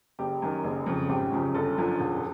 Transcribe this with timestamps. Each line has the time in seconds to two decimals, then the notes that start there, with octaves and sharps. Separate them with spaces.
0.19 F#1 G4
0.42 F#2 D#3
0.64 F#1
0.86 F2 C#3
1.09 G#1 G4
1.32 F#2 C#3 F3
1.54 G1 A4
1.78 F#2 D3 F3
2.00 E1